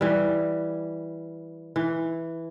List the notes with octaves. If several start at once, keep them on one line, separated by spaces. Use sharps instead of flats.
E3 G3
E3